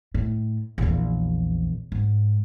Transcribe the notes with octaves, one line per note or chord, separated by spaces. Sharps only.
A2
A#1 E2
G#2